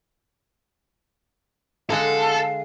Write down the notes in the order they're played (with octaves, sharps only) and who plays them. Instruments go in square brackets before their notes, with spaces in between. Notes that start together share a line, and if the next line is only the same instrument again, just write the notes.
[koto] D3 G#3 F#5 [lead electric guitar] A4 [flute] F5